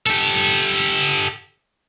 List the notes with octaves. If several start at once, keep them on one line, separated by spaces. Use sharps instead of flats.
G4 A4